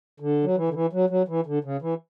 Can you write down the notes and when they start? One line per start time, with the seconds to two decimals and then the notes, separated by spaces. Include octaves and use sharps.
0.20 D3
0.44 F#3
0.57 E3
0.69 D3
0.74 E3
0.93 F#3
1.10 F#3
1.28 E3
1.46 D3
1.64 C#3
1.82 E3